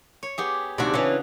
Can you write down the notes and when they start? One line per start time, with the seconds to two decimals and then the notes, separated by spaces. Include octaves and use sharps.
0.23 C#5
0.38 B3 G4 G#4
0.78 D#2 C3 D4 F#4
0.94 C#3 E3 C#4